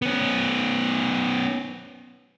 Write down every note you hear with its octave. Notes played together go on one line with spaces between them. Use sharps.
B3 C#4